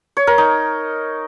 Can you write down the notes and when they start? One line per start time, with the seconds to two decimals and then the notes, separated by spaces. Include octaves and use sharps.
0.17 C#5
0.27 A#4
0.38 D#4